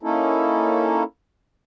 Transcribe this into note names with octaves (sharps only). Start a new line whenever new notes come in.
A#3 C#4 D#4 E4 A4